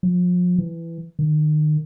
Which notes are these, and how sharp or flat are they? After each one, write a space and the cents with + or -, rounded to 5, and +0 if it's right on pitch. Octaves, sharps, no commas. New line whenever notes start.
F3 +35
E3 +15
D#3 -35